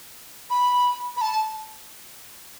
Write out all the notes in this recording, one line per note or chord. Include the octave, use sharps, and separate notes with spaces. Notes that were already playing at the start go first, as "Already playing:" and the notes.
B5
B5
A5